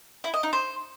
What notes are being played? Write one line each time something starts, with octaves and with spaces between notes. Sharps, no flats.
E4
D#5
D#4
C5